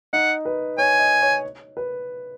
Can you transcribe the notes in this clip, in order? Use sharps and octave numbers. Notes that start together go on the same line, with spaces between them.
D#4 F#5
B4
C#5 G#5
D#5
C#5
B4